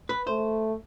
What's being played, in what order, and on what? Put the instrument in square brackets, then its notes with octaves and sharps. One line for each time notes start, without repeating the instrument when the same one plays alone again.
[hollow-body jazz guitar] B4
[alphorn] A3 [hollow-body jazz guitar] C5